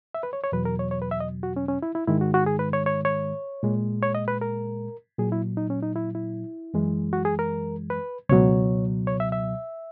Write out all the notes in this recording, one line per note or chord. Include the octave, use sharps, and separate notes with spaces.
E5
B4
C#5
C#5
E2 B2 F#3 B4
A#4
C#5
C#5
B4
E5
D#5
F#4
C#4
C#4
E4
E4
G#2 D#3 G#3 E4
F#4
F#4
G#4
B4
C#5
C#5
C#5
A#2 G#3
C#5
D#5
B4
A#4
A#2 F#3 G#4
E4
D#4
C#4
D#4
E4
E4
F#2 E3 G#3
F#4
G#4
A#4
B4
C#2 B2 F#3 C#5
C#5
E5
E5